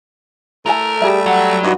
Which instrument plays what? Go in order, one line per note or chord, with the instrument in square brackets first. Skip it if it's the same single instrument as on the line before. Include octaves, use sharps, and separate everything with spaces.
[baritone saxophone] A3 [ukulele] E4 A4 G#5 [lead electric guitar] A#4
[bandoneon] G3 [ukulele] G4 G#4 E5
[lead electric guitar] F#3 [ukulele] F#5
[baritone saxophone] G2 [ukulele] D#4 E4 F#4